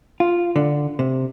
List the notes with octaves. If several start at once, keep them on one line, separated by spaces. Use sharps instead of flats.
F4
D3
C3